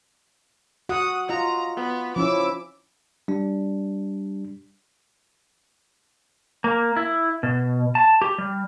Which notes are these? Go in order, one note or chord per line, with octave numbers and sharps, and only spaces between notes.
F#4 F#5 D#6
F4 D#5 A#5
B3
F3 C#4 E4 D6 E6
G3 D4
A#3
E4
B2
A5
G4
G3